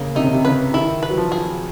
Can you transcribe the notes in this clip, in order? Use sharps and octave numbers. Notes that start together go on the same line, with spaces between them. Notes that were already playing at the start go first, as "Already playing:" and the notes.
Already playing: C#3 A#3
C3 D#4
C#3
C3
C#3 B4
D#3 E4
B4
F#3
F3
G#4